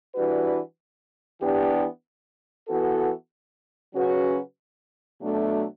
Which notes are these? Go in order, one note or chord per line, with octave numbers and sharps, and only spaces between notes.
E3 G3 D4 F#4 B4
E3 B3 D4 G4
E3 B3 F#4 A4
C#3 F#3 C#4 F#4 B4
B2 F#3 A3 D4